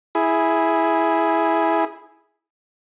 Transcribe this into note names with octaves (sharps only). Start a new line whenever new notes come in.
E4 G#4